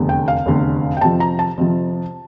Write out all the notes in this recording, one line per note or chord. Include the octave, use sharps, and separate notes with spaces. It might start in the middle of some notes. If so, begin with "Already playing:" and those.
Already playing: F1 E2 D3
G5
F5
F1 E2 D3
G5
F2 C3 F3 A5
A#5
A5
F2 C3 F3